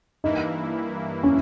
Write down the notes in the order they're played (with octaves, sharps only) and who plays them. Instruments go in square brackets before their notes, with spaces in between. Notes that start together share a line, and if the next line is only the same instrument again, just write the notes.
[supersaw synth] G2 E3 A#3 E4 [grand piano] D#4
[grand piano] C#4